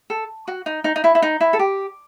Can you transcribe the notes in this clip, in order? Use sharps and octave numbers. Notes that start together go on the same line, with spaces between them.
A4
F#4
D#4
D#4
D#4
E4
E4
D#4
E4
A4
G4